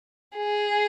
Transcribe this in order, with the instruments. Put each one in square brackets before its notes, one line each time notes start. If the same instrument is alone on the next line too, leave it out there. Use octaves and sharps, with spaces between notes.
[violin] G#4